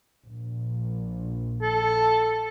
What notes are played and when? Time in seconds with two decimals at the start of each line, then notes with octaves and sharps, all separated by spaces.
0.25 A#1
1.62 A4